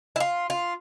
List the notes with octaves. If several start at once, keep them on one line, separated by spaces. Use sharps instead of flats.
E4
F4
F4